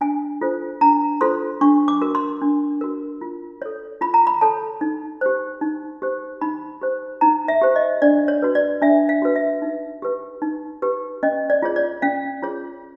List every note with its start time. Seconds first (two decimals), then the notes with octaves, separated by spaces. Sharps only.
0.01 D4 G#5
0.41 F4 A4 C5
0.81 D4 A#5
1.21 F4 A4 C5 C6
1.61 D4 C#6
1.88 D6
2.01 F#4 A#4
2.15 C6
2.42 D4
2.81 F#4 A#4
3.21 F4
3.62 A4 C#5
4.01 F4 B5
4.14 A#5
4.27 B5
4.41 A4 C#5 A5
4.81 D#4
5.21 G4 C5
5.61 D#4
6.02 G4 C5
6.41 D#4 B5
6.81 G4 C5
7.21 D#4 A#5
7.48 E5
7.61 G4 C5
7.76 D#5
8.02 D4 D5
8.28 C#5
8.42 F#4 B4
8.55 D5
8.82 D4 E5
9.09 F5
9.22 F#4 B4
9.36 E5
9.62 D#4
10.02 G4 B4
10.42 D#4
10.82 G4 B4
11.23 C#4 D#5
11.50 D5
11.62 F4 G#4 C#5
11.76 D5
12.02 C#4 F5
12.42 F4 G#4 C#5